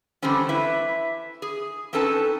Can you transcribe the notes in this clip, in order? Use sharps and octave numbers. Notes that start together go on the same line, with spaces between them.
D3 E3 G3 C4 C#4
E4 B4 E5
G#4
C4 C#4 D#4 A4 B4 A5